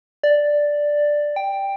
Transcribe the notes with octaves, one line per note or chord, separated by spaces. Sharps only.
D5
G5